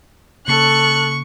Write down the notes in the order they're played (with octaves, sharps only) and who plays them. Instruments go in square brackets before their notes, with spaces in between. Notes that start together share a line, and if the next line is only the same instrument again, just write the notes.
[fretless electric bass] C#3 A#3 [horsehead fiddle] A4 [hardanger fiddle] C#6 [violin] F#6